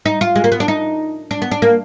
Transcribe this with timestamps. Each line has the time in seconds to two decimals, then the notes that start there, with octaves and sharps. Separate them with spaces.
0.06 D#4
0.21 F4
0.36 G#3
0.44 A#3
0.52 B3
0.60 D4
0.68 D#4
1.31 D4
1.42 B3
1.51 D4
1.62 A#3